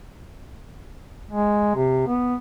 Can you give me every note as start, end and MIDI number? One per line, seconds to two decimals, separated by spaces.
1.31 1.74 56
1.75 2.06 48
2.07 2.35 59